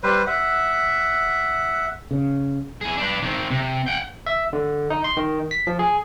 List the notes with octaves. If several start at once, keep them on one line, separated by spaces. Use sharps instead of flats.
G3 B4 C5
E5 F#5
C#3
E4 G#4
D4 B4
D#3 C4
C3
F#5 G5
E5
D3
D#4
C6
D#3
B6
F3
G#4